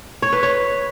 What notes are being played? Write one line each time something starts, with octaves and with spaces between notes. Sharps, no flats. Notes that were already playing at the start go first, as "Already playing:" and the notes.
C#5
B4
C#5